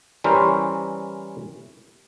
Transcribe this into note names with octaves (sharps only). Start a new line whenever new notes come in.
E3 G3 C#4 E4 A#4 C5